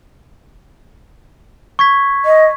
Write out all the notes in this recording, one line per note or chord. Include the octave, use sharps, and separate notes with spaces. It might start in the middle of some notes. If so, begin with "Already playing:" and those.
C#6 G#6 B6
D#5